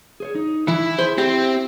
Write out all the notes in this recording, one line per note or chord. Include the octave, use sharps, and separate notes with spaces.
G#4 C5 C#5
D#4
E3 E4
G#4 C5
C4 E4 G4